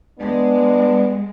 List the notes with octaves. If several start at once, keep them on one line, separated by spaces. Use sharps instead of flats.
G#3 B3 D4